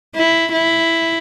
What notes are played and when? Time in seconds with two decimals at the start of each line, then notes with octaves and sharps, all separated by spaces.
0.16 E4
0.52 E4